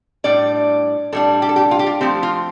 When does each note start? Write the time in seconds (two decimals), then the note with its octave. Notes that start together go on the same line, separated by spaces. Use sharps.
0.24 A2 G3 D4 D5
1.12 A2 G3 D4 A4
1.42 G4
1.49 A4
1.56 G4
1.71 F4
1.79 G4
1.87 F4
2.01 F3 A3 C4 G4
2.23 F4